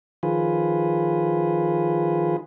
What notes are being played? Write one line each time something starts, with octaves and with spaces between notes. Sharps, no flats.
D#3 F3 F4 G#4 B4